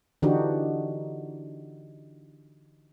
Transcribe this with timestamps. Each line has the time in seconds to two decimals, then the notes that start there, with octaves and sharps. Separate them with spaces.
0.22 D3 E3 D4 D#4 F#4 G4